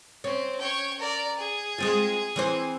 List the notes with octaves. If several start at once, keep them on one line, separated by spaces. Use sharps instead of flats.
C4 C#4
C#5 G5
A#4 D5
G#4
G#3 C4 F4
E3 C4 C5